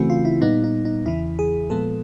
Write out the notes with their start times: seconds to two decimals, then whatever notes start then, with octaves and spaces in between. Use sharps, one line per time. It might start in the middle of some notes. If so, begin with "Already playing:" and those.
Already playing: C#3 E3 A3 C4 F#4
0.10 F4
0.25 E4
0.41 A#2 G3 B3 D#4
0.64 D#4
0.85 D#4
1.06 E2 C#3 E3 E4
1.39 G#4
1.70 A#2 F3 G#3 B3 A4